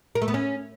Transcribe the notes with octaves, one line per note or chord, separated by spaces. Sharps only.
A#4
A3
B3
C#4